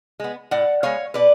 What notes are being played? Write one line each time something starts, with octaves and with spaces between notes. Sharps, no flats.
G#3 B3
A2 D5 F#5
G#3 B3 C#5 F5
B2 B4 D5